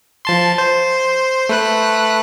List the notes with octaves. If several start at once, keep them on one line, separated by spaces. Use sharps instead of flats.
F3 A5 C6
C5
A3 B4 F#6